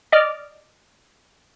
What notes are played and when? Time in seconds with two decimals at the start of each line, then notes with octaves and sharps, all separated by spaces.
0.12 D5 D#5 D6 F6